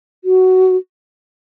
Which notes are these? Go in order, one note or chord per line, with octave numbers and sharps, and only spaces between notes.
F#4